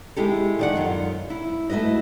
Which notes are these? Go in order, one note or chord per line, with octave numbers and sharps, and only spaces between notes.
G#3 E4 G4 A4
D#3 D5 F#5
F#2 F4
E4
A3 E4 F#4 B4 D#5